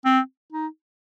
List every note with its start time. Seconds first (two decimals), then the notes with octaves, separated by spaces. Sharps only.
0.05 C4
0.52 D#4